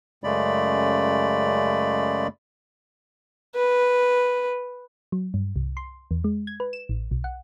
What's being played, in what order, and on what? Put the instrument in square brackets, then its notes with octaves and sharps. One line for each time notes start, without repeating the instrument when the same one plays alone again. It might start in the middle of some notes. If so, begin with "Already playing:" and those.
[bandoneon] F#2 C#3 G#3 A3 D5 B5
[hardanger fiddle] B4
[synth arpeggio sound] F#3
G2
C2
C6
E2
G#3
G#6
B4
E7
A1
B1
F#5